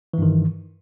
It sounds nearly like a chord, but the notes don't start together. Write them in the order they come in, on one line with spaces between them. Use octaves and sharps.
E3 G2 D#3